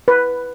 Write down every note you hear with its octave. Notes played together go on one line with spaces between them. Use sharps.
B4